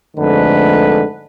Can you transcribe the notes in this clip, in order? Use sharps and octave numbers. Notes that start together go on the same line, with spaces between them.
F2 G#2 D3 A3 B4